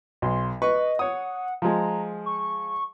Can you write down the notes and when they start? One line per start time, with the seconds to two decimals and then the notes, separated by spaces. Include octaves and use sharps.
0.22 B1 C6
0.62 B4 D#5 C#6
0.99 C#5 F#5 D#6
1.62 F3 G#3 A#5
2.26 C#6